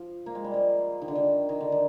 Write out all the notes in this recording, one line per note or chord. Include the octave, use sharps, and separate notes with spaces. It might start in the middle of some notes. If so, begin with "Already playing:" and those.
Already playing: F3
A#3
G#3
G3
F3
D#3
D3
D#3
D#3
D3
D#3